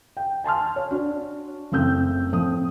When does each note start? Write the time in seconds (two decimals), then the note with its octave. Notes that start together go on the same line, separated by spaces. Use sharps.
0.17 G5
0.44 G#5 A5 C6 F6
0.76 C#5
0.91 D4 F#4
1.72 F#1 A3 C4 E6 G6
2.32 A2 F3 C4 D#6